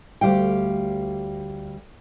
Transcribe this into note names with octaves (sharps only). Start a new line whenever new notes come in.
D2 G3 F5 G5